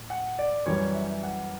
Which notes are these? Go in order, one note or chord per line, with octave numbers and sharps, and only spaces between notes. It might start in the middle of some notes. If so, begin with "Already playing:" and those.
Already playing: A2
F#5
D5
F#2 E3 G3 C#5
E5
F#5